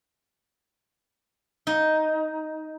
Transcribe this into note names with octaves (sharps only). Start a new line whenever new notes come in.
D#4